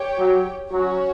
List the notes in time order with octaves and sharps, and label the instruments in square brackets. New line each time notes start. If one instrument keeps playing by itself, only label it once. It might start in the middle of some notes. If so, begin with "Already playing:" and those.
Already playing: [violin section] G4 C#5 G5
[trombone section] F#3
[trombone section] F#3 [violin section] C#4 F#4 C#5